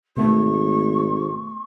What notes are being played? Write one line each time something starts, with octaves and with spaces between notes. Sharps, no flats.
G#1 B2 A3 C#6